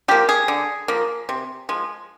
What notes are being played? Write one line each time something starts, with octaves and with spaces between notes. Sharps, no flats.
F3 A#3 G4
G#4
D3
F3 A#3
C3
F3 G#3